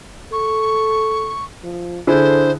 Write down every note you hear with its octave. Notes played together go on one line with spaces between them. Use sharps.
A4 C#6
F3
D3 E4 G#4 A4 C5